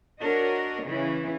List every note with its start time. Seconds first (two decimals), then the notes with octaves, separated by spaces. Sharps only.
0.21 D4 F#4 A#4 C#5 D#5
0.84 C#3 E3 C#4